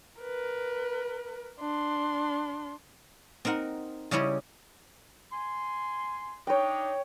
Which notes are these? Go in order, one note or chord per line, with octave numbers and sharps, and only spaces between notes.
A#4 B4
D4 C6
C4 D#4 A#4 F#5
C#3 G3 C#4 E4 C#5 D#5
G#5 C6
D4 D#4 C#5 G5